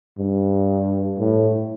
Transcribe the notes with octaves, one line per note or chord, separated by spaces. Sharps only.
G2
A2